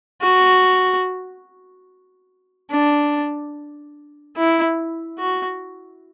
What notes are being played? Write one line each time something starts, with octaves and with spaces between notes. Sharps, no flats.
F#4
D4
E4
F#4